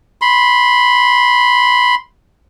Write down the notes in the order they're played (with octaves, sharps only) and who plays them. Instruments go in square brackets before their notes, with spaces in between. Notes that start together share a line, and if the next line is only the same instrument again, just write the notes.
[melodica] B5 C6